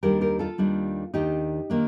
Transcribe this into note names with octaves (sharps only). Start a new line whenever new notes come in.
D#2 D#3 G3 D4 G4 A#4
G4 A#4
F4 A4
D#2 D#3 G3 D4
D#2 D#3 A#3 D4 D#4 G4
D#3 A#3 D4